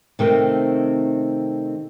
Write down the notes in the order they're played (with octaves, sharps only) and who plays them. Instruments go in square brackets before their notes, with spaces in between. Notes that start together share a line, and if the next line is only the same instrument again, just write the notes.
[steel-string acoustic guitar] C3 D#3 A3 C4